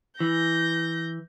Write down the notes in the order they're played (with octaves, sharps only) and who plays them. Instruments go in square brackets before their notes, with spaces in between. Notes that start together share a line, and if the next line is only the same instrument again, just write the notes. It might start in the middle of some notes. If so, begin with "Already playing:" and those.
[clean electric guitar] E3 [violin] G6 A#6